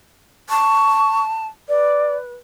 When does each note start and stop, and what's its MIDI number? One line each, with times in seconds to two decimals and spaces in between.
0.50 1.47 81
0.50 1.21 85
1.68 2.34 71
1.68 2.15 74